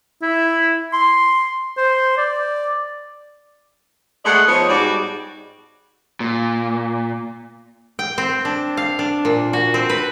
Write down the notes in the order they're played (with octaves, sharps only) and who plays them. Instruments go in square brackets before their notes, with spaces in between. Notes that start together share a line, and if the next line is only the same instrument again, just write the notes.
[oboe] E4
C6
C5
D5
[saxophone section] G#3 A3 B3 D5 D#5 F#5
F3 B3 D#4 C#5
G#2 G3 F#4 D5
[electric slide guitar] A#2
[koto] G5
C4
D4
F5
D4
A#2
F#4
C4
B4